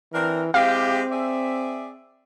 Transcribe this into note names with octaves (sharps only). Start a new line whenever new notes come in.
E3 C4 D4 A#4
G#3 C4 E4 G4 F5
G#4 D5 E5